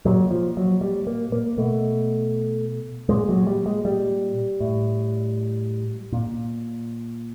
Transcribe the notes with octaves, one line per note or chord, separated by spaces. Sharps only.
A#2 F#3
F3
F#3
G3
A#3
A#3
B2 A3
A#2 G#3
F#3
G3
G#3
G3
A2
A#2